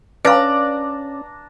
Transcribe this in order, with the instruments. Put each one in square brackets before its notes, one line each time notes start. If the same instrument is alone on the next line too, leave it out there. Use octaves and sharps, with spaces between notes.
[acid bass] C#4 [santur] D4 A#5 [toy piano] B4 F5 [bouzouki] D5